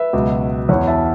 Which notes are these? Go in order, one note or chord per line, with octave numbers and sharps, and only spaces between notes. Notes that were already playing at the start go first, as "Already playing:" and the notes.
Already playing: B4 E5
C#2 B2 F#3
E2 E3 C#5 F#5
E5 A5